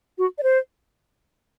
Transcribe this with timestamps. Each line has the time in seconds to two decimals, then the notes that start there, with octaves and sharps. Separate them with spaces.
0.18 F#4
0.38 D5
0.43 C5